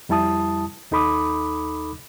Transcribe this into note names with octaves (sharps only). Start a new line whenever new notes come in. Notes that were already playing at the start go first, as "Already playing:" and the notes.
F2 G3 E4 A5 D#6
D#2 D#4 A4 B5 D6 D#6